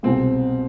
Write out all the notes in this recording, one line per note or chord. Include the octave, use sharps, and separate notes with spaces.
C2 B2 G#3 C4